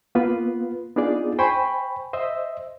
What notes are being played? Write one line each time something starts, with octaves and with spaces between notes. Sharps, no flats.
A#3 B3 F4 B4
B3 D4 D#4 F4 G#4 D5
C5 G5 G#5 B5 C#6
C5 D#5 E5